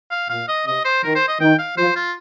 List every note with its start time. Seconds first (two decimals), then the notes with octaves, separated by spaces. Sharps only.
0.11 F5
0.30 A#2 F5
0.48 D#5
0.66 C3 D#5
0.85 C5
1.04 D#3 A#4
1.15 C5
1.28 D#5
1.40 D#3 G5
1.59 F5
1.77 F3 C5
1.95 F4